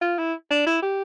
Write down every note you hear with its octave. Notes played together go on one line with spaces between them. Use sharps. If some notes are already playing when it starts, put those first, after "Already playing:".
F4
E4
D4
E4
G4